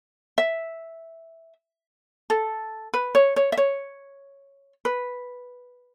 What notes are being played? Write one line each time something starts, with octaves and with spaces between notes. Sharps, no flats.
E5
A4
B4
C#5
C#5
E5
C#5
B4